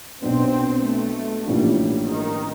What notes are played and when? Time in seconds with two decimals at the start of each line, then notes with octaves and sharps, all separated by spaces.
0.22 B1 B2 F#3 B3 C4 D4
0.83 A3
1.46 A1 A2 F3 G3 A#3 D4
2.08 D#3